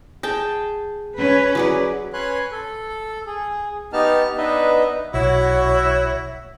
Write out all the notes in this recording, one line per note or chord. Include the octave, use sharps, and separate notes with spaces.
G#4 G5 A5
C#4 B4
F#3 G#4 D5
C#4 B4 C#5 G#5 C6 F#6
A4
G#4
B3 D#4 G4 A5 F6
B3 D4 D#4 B4 D#5 E5
B1 E4 F#4 C#5